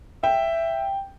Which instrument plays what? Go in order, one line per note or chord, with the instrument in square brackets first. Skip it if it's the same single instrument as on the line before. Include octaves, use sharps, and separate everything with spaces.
[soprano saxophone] E5 [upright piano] G5